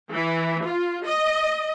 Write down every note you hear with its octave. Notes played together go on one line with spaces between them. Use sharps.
E3
F4
D#5